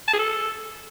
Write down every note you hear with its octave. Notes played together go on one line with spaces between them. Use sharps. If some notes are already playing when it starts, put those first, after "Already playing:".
A5
G#4
A4